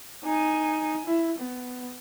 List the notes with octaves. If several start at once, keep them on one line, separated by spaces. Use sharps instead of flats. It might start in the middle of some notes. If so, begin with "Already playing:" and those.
D#4 G#5
E4
B3